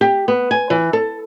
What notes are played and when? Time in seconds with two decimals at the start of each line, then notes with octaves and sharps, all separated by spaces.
0.01 G4
0.28 B3
0.51 G#5
0.70 E3
0.93 A4